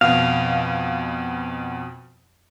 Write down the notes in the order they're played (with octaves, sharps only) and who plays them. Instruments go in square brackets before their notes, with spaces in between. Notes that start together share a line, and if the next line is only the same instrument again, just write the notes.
[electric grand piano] F2 B2 [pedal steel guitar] F5